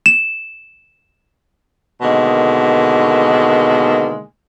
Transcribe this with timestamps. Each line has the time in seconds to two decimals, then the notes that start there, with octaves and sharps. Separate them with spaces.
0.06 E7
2.01 B2 D3 D#3 G#3 A#3